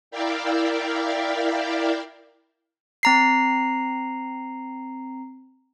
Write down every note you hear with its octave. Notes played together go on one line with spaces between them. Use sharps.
E4 A#4 D5 E5 F5 G5
C4 A#5 C7